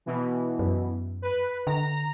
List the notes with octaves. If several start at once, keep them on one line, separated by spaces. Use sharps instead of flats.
B2 E3
F#2
B4
D3 A#5